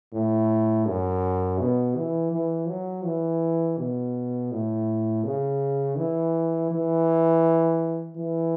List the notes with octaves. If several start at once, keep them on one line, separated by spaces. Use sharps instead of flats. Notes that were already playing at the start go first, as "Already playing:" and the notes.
A2
F#2
B2
E3
E3
F#3
E3
B2
A2
C#3
E3
E3
E3